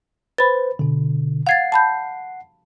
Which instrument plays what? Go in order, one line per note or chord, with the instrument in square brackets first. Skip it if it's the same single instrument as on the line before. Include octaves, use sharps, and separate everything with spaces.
[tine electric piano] B4 C5 [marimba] B5 A6
[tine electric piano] B2 D3
[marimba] F5 G#6 A6 [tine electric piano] F#5 C7
[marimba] A5 B5 G6